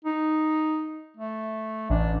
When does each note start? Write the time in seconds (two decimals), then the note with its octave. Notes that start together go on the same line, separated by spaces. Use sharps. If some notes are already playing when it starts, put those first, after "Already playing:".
0.04 D#4
1.17 A3
1.90 A1 D4